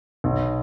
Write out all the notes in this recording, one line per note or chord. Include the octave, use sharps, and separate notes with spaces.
B1